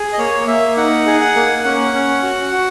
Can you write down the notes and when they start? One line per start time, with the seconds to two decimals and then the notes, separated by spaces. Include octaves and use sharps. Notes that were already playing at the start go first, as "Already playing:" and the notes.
Already playing: G#4
0.13 D#5
0.18 A#3 C#5
0.47 A#3 E5
0.77 D#4 F#5
1.06 G#4
1.21 F#5
1.36 A#3
1.64 C#4 F#5
1.93 C#4
2.23 F#4
2.53 F#4